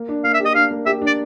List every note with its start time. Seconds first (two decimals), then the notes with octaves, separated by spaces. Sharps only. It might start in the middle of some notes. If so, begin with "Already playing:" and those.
Already playing: A#3
0.08 D4
0.24 A#3 F5
0.34 E5
0.40 G4
0.45 D#5
0.55 D4 F5
0.71 A#3
0.86 G4 E5
1.02 D4
1.07 D5